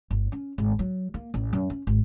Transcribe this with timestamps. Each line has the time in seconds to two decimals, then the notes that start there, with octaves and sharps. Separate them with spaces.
0.11 G1
0.32 C#4
0.58 G#1
0.79 F#3
1.14 A#3
1.34 A1
1.53 F#2
1.70 C#4
1.87 G#1